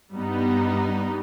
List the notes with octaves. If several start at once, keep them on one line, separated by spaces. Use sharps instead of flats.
G2 G3 B3 D#4